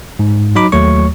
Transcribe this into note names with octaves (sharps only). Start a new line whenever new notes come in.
G#2
F#3 D#4 B5 D6
D#2 F#3 A3 C#5 C#6